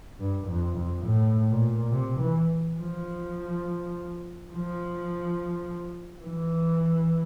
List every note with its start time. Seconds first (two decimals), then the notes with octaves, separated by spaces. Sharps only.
0.19 G2
0.47 F2
0.76 F2
1.05 A2
1.49 A#2
1.91 C3
2.21 E3
2.79 F3
4.52 F3
6.25 E3